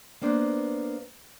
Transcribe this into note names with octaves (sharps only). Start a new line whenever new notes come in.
A#3 B3 D4 C5